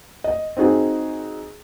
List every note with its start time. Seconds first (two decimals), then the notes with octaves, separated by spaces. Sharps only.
0.24 D#5
0.57 C4 D#4 F#4 G#4